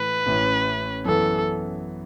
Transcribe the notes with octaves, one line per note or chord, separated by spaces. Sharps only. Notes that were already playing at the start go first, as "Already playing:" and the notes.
Already playing: A2 E3 A3 B4
A1 A2 E3 C#4
F#2 E3 B3 A4